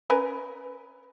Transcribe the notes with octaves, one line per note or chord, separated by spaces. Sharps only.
C#4 A#4 B4